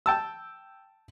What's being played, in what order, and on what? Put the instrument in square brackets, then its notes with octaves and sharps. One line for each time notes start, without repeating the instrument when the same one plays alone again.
[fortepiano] G5 A5 E6